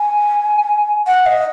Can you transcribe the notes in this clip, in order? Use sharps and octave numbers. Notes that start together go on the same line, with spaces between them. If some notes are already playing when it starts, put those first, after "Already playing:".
Already playing: G#5
F#5
D#5